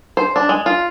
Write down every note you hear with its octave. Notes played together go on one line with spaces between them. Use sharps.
C5
D4
G#3
F4